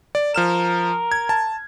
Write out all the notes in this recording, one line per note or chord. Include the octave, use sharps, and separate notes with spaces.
D5
F3 A#4 F6 E7
G#6
A5